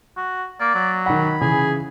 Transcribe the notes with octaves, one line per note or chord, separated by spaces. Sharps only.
F#4
A#3 D5
F#3
D#3 F#5 B5
C#3 E3 G#4